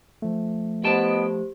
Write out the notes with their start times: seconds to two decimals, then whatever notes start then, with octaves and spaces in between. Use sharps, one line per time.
0.22 F3 A3
0.84 B3 E4 G4 C5 D#5 G5 A5